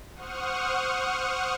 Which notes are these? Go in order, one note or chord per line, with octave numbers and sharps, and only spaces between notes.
C5 F#5 C#6 D#6 F6